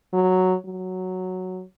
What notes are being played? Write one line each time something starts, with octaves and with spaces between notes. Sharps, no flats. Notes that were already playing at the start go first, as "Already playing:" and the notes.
F#3
F#3